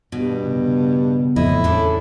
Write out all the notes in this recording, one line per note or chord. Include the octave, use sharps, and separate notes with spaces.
G2 B2
C#3
C#3
F2 A2 E4 D#5
E2 C#3 D4 A4